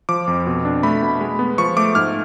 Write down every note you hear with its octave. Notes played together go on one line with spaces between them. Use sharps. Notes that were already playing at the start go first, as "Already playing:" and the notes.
F3 D6
F2
B2
D4
A3 B5
B2
G#3
B3
F3 C#6
A3 D6
G#2 F6